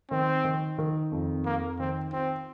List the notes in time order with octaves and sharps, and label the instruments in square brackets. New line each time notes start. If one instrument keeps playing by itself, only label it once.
[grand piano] D#3 [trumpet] C4
[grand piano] D#3
D#3
F2
[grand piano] F2 [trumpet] A#3
[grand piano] D#3 [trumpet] C4
[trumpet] C4 [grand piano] F4